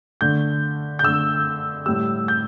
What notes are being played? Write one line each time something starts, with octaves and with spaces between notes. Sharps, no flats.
D3 A3 G6
G6
D3 A3 E6
A2 G3 E6
G6